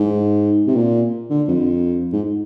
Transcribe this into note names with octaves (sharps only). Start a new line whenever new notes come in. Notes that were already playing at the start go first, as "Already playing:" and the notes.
Already playing: G#2
C3
A#2
D3
F2
G#2